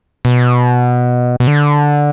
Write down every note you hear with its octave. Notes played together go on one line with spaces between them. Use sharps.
B2
B2
D3